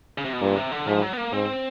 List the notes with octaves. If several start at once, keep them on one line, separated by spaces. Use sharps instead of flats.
C#3
C3
B2
G2 A#2
C3
D3
G#2 F3
F#3
B3
A#3
G#2 C4